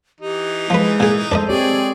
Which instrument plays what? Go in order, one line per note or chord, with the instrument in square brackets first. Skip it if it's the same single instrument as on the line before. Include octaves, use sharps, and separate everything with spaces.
[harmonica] E3 D#4 [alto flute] G4
[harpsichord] F3 B4 [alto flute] G#3
[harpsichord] A#2 G#4
[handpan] G#3 A4 C5 [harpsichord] D4 A#4 D#5
[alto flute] C4 [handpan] G4 C#5 [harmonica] G#4 D5